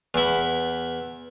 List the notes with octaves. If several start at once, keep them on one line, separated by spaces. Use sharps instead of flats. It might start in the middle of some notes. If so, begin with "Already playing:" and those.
E2 E4